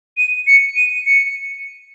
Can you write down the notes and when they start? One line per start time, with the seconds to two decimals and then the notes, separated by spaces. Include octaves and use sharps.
0.17 D#7
0.47 C#7
0.76 D#7
1.06 C#7